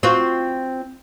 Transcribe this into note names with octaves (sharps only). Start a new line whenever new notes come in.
C4 F4 F#4